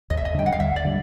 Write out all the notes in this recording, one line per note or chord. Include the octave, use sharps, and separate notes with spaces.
D#2 D#5
E5
D#5
D3 G3 G5
F#5
F5
D#2 E5
D5
D3 G3